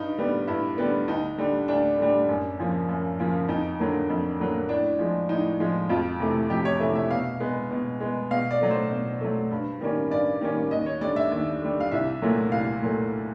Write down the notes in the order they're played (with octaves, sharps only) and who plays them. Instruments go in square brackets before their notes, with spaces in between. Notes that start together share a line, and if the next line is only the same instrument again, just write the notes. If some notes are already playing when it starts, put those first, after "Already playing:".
Already playing: [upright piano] G2 D#4
D3 G3 B3
G2 E4
D3 G3 B3
D2 D#4
D3 G3
D2 D4
D3 G3
F#2
C#3 F3 A#3
F#2
C#3 F3 A#3
F2 D#4
D3 F#3 A#3
F2
D3 F#3 A#3
A2 D4
F3 G#3
A2 D#4
F3 G#3
F2 F4
C3 E3 A3
F2 G4
C#5
C3 E3 A3 E5
E5
B2 F5
G#3 B3
B2
G#3 B3
B2 F5
D5
F#3 A3
C5
B2
F#3 A3
G2
D#3 G3 A#3 C#4
G2 D5
D#3 G3 A#3 C#4
D#2 D#5
C#5
D3 G3 D5
E5
D#2
D3 G3
F5
C2 E5
A#2 F#3 A3
C2 F5
A#2 F#3 A3